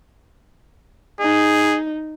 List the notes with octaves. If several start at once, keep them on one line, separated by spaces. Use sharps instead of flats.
D#4 G#4